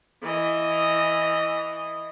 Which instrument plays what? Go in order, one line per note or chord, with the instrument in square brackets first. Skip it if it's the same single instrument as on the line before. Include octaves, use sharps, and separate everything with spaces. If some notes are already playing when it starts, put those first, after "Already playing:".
[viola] E3 D#5